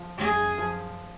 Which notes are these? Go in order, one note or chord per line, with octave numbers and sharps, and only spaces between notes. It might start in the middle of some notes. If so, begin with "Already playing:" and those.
Already playing: F3
F#2 G#4
F3